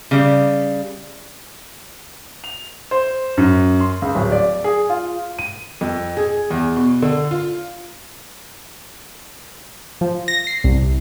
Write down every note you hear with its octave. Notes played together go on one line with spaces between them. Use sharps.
C#3 G3
F7
C5
F#2
C6
C#2
D1
D5
G#4
F4
D#7
F2
G#4
E2
B2
D3
F4
F3
A#6
C7
C2